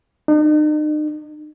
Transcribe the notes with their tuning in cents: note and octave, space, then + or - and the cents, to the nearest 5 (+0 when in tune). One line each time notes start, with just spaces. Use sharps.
D#4 -40